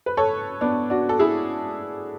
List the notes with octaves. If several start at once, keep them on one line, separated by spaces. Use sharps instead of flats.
B4
A4 C#5
B3 D4
D4 F#4
A4
E4 G#4